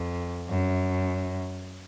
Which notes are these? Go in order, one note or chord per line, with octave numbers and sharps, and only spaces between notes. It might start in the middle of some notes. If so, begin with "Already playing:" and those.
Already playing: F2
F#2